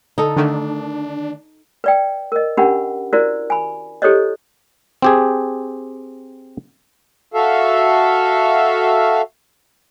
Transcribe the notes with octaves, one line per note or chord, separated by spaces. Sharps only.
D3 D#4 A4
D3 D#3 A3 D4
B4 D5 G5
A#4 D#5
C#4 D4 G4 A#4 F#5 B5
E4 F#4 A#4 C5 D5
G#5 B5
E4 G4 A4 C5 C#5 D#5
C4 G4 G#4
F#4 A4 E5 F5